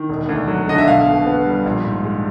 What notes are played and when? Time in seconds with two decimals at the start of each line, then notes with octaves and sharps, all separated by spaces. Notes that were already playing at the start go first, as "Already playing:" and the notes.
Already playing: D#3
0.09 E1
0.29 D2
0.48 F#3
0.68 D3 D#5
0.78 E5
0.88 B1 F5
1.06 B2
1.27 B3
1.46 G3
1.66 A#1
1.85 G#2
2.04 G#3